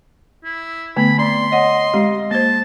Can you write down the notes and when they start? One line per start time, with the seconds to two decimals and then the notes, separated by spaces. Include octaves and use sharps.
0.44 E4
0.96 D3 A3 B3 B5
1.19 C4 D5 C6
1.52 C#5 D#5 F#5
1.94 G#3 C4 G4
2.31 A#3 C5 A5